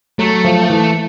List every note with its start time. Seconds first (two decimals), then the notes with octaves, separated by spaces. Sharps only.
0.19 F#3 A3
0.44 F3
0.70 E3